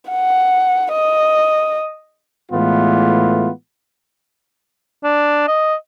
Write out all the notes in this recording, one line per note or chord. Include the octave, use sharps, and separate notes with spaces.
F#5
D#5
A2 E3 G#3 A3 B3 F4
D4
D#5